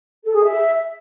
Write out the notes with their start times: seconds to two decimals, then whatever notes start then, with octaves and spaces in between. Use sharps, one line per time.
0.24 A4
0.34 G#4
0.44 E5